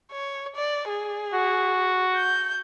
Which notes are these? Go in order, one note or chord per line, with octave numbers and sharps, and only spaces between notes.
C#5
D5
G#4
F#4
G6